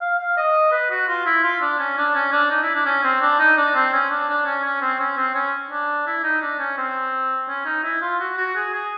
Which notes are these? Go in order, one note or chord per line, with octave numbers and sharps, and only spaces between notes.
F5
F5
D#5
B4
F#4
F4
E4
F4
D4
C#4
D4
C#4
D4
D#4
E4
D4
C#4
C4
D4
D#4
D4
C4
C#4
D4
D4
C#4
C#4
C4
C#4
C4
C#4
D4
E4
D#4
D4
C#4
C4
C#4
D#4
E4
F4
F#4
F#4
G#4
G#4